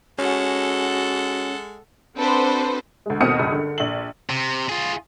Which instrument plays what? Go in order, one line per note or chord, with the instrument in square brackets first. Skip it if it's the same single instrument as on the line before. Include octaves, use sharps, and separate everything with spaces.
[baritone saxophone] G#3 [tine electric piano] C#4 [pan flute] F#4 [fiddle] A4 F#5
[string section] C4 D4 F#4 A4 B4 C5
[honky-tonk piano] D2 G#3
D#2 B2 C4 D#6 F6 C#7
C#2 G2 D#6
D3
A#1 F#7
[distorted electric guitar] C3
F4 G#4